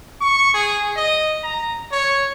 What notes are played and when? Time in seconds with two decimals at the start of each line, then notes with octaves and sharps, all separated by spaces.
0.21 C#6
0.54 G#4
0.96 D#5
1.43 A#5
1.92 C#5